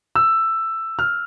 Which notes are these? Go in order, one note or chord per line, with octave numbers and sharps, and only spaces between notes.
E6
F6